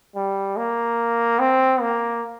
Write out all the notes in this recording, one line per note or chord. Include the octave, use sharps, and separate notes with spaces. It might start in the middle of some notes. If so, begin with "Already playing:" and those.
G3
A#3
C4
A#3